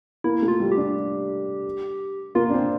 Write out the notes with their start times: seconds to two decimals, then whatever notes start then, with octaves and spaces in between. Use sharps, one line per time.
0.24 A#3 E4
0.42 A3
0.48 F4
0.60 G3
0.72 G4
0.77 D4
2.35 A#3 F4
2.49 D4
2.54 C4